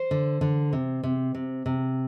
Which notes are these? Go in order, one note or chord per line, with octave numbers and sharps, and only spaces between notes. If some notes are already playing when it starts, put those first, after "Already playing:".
Already playing: C5
D3
D3
C3
C3
C3
C3